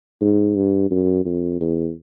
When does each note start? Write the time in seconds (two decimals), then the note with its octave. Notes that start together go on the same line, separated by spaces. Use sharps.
0.21 G#2
0.55 G2
0.90 F#2
1.25 F2
1.60 E2